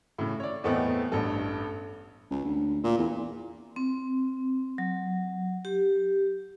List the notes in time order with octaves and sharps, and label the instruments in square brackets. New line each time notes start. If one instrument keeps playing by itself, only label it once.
[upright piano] A2 C#3
C#5 D5
E2 A2 A3 B3 C4 D#5
A1 G2 A4
[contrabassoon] C#2
D2
A#2
E2
[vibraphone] C4
F#3
G4